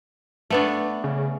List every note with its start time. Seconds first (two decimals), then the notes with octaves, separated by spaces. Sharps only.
0.50 A3 B3 D4
1.04 C#3